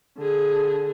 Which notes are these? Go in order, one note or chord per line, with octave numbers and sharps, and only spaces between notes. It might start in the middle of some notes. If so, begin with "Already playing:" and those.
D3 G#4